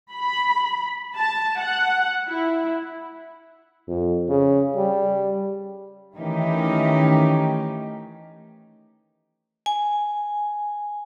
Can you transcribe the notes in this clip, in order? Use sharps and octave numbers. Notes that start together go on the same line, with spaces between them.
B5
A5
F#5
E4
F2
C#3
G3
D#3 E3 A3 C#4 D#4 G4
G#5